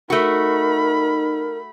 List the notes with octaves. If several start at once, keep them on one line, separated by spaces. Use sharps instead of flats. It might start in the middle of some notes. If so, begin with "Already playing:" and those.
A3 D#4 F#4 A#4 B5